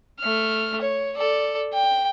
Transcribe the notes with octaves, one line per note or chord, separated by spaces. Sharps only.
A3 F6
C#5
A4 D5
G5